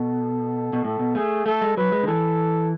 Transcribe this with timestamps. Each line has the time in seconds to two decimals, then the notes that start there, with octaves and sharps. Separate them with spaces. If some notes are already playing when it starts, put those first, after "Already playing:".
Already playing: B2 A4
0.73 B2
0.84 A2 A4
0.99 B2
1.15 A3 G#4
1.46 A3 A4
1.61 G#3
1.77 F#3 B4
1.92 G#3
2.03 D3
2.07 E3 A4